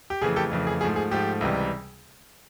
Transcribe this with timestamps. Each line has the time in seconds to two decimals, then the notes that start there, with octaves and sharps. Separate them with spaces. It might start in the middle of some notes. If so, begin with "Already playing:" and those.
0.10 G4
0.21 F2 C#3 E3 A3 G#4
0.36 G4 A4
0.51 F2 C#3 E3 A3
0.67 G#4
0.81 G#2 F3 A3 G#4
0.96 G#4
1.11 G#2 F3 A3 G4
1.41 C#2 C3 E3 G3